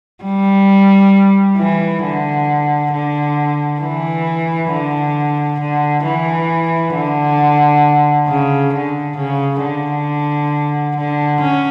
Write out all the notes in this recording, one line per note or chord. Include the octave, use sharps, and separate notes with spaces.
G3
E3
D3
D3
E3
D3
D3
E3
D3
C#3
D3
C#3
D3
D3
C#4